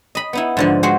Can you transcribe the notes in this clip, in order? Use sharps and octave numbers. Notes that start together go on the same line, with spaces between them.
D#5 B5
B3 D#4 E4
G#2 D3 F3
G#3 F#4 C5 F#5